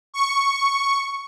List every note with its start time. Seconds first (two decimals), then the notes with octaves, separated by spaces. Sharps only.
0.14 C#6